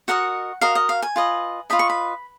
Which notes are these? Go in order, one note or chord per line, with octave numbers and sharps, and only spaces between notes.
F#4 A#4 D#5 F#5
F#4 A#4 D#5 F5
D#5
F5
G#5
F4 B4 D#5
F4 B4 D#5 B5
C#6
B5